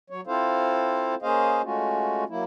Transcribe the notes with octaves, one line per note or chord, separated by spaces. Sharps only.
F#3 C#5
C4 E4 F4 A4 C5 F5
A#3 C#4 G#4 C5 D#5 F5
G#3 A3 C#4 F4 F#4
F#3 A#3 E4